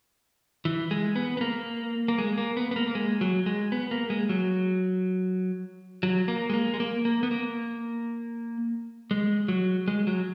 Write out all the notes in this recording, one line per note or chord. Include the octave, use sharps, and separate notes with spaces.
E3
G#3
B3
B3
A#3
A#3
G#3
A#3
B3
B3
A#3
A#3
G#3
F#3
G#3
B3
A#3
G#3
F#3
F#3
A#3
G#3
A#3
G#3
A#3
A#3
B3
A#3
G#3
F#3
G#3
F#3